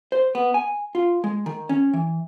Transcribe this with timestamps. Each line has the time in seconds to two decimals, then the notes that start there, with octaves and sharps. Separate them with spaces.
0.12 C5
0.35 B3
0.54 G#5
0.95 F4
1.24 G#3
1.46 D#3
1.69 C#4
1.94 E3